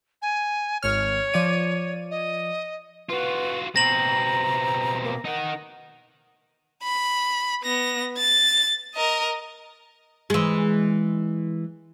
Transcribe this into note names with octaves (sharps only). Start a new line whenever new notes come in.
G#5
G#1 C#5 F6
F3 D5 D#7
D#5
F4 F#4 B4
B2 C4 A#5 A#6 F#7
A#3
D#4 A#4 F#5
B5
B3 A#6
A6
A#4 D#5
E3 G#3